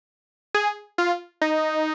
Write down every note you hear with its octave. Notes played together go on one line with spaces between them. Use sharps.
G#4
F4
D#4